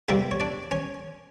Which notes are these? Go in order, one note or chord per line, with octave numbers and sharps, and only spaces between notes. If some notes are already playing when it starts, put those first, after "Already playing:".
E2 C3 D#3 G3 A#3 E4 E5
C#5
D4 D5
C#4 C#5